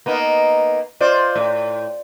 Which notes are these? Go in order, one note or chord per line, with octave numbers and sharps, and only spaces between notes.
A#3 B3 D#4
F4 C5 D5
A2